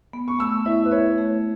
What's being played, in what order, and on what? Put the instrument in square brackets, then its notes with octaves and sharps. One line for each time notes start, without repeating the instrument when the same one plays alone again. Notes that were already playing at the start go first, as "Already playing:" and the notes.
[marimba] B3
[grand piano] C#6
[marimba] A3 [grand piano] E6
[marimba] E4 [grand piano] E5
[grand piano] B4
[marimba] E4 [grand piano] C#5
[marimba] A3